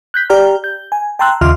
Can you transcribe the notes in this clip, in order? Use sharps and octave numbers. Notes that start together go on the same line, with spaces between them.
F#6 G6 B6
G4 D5 G5 A#5 F6
G6
G#5
G5 A5 A#5 C6 E6 F#6
D#2 C#3 F4 E5 C6 F6